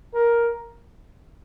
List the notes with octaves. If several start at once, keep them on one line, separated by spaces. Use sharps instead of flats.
A#4